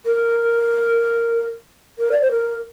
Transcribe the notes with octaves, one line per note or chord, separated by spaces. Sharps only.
A#4
A#4
D5
C5
A#4